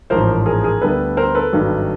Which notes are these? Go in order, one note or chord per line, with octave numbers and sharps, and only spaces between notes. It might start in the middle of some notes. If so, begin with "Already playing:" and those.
A1 G#2 F3 A#4 C5
G#4 A#4
G#4 A#4
D2 D3 G3 B3 D4 A4 B4
A#4 C5
A4 B4
G#1 G2 D#3 F#3